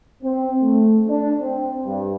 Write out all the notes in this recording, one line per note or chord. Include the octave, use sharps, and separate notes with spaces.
C4
A3
D4
C4
G2